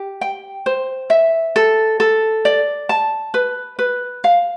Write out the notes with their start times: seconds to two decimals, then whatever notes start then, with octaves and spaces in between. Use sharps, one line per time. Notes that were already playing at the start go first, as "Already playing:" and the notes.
Already playing: G4
0.21 G5
0.66 C5
1.10 E5
1.56 A4
2.00 A4
2.45 D5
2.89 A5
3.34 B4
3.79 B4
4.24 F5